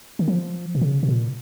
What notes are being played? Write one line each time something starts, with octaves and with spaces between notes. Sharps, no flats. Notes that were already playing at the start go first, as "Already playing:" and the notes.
D#3
F3
B2
C#3
B2
A#2